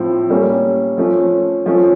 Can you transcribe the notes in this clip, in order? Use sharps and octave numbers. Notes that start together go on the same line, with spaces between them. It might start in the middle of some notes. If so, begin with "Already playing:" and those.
Already playing: A2 F3 C4
G3 A#3 C#4
F3 A3 C#4
F3 A3 C#4